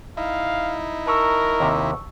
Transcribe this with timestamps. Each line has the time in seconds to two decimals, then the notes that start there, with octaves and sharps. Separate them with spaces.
0.17 D#4 E4 F5
1.07 A#4 A5 C#6 E6
1.60 D#2 C3